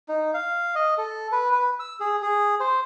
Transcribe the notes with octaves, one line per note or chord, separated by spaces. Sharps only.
D#4
F5
D#5
A4
B4
B4
E6
G#4
G#4
C5